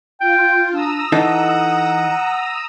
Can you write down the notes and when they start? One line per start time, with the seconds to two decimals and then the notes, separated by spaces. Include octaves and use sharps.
0.20 F4 G5
0.72 D4 A#5 D#6 E6
1.12 E3 D#4 A4 F#5